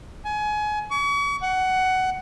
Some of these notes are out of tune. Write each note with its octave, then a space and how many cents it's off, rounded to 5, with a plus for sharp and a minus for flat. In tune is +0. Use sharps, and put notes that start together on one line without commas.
G#5 +25
C#6 +40
F#5 +15